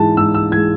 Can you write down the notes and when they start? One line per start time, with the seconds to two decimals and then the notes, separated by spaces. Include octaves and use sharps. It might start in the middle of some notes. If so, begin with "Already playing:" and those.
Already playing: G#2 E3 G#3 A5
0.17 G#2 E6
0.34 E6
0.52 E3 G#6
0.56 G#3